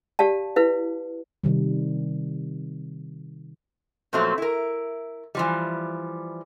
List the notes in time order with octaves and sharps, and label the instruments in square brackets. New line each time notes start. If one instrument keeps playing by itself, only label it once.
[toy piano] G4 D5 F5 A5
E4 B4 F5
[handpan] C3 D#3 G3
[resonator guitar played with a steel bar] A#2 F3 F#3 A3 B3 C4
E4 A#4
E3 F3 G3